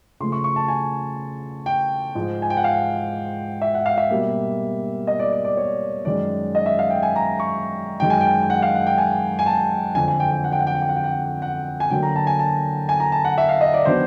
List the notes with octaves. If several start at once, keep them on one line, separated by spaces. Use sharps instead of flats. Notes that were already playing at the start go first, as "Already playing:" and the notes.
C#3 F3 A3 C6
C#6
C#6
A5
G#5
G5
G#2 F3 G#3
G#5
G5
F#5
F5
E5
F#5
F5
E5
B2 G3 A#3
D#5
D5
D5
D5
C#5
F#2 D#3 G#3 C#4 D5
D#5
E5
F5
G5
G#5
A#5
C#6
F#2 D#3 G#3 G5
G#5
G5
G5
F#5
F5
F#5
G5
G#5
G#5
A5
F2 D3 F3 G#5
G#5
G5
G5
F#5
G5
F#5
G5
F#5
G5
F#5
G5
F#5
F#5
G#5
D3 F#3 A#3 G5
A#5
A5
G#5
A5
G#5
A#5
A5
F#5
E5
F5
D#5
D5
D#3 F#3 B3 D4 C5